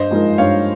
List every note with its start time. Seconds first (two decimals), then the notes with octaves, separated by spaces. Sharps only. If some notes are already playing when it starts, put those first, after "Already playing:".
Already playing: G2 C5 D#5
0.11 F3 G#3 D#4 A#4
0.38 G2 C#5 F5